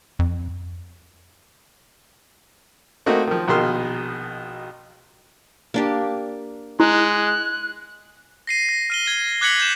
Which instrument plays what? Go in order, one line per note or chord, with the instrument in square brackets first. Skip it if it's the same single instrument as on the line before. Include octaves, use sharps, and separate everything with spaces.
[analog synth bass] F2
[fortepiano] A3 A#3 C4 D#4 F#4
D#3 F3
A#1 B2 D#3 C6 F6
[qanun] A#3 D4 G4
[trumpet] G#3 [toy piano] E4 [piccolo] F#6
[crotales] A#6 C7 D#7
A#6
F6 D#7 G7
G#6 D#7 G7
D6 F#6 G#6 B6 C#7 F#7
G6 E7